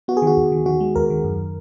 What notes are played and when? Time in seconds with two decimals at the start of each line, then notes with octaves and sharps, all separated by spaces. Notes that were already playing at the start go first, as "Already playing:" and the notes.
0.08 B3 F#4
0.17 G#4
0.22 D#3 F#4
0.37 D#2
0.52 D#3
0.66 D#3 F#4
0.80 G#3
0.96 D#2 A#4
1.10 D#3
1.24 F#2